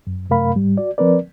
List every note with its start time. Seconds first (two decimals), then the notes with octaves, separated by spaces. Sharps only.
0.07 F#2
0.30 F#2 C3 A3 A#4 F5 B5
0.55 G#2 G3
0.77 F#4 D5
0.98 F3 C4 A#4 B4 D5